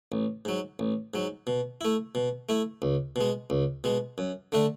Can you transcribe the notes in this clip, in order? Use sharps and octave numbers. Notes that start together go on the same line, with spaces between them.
A1
G#2 F#3
A1
G#2 F#3
B2
A3 E4
B2
A3 E4
C#2
B2 G#3
C#2
B2 G#3
F#2
D3 A3 D4